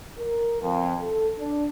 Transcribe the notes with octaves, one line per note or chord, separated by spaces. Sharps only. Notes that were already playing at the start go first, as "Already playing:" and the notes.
A#4
F2
A4
D4